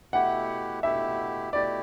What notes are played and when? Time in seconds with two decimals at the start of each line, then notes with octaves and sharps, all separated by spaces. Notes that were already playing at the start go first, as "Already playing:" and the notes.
0.13 B2 A3 E4 G4 F#5
0.83 B2 A3 E4 G4 E5
1.53 B2 A3 E4 G4 D5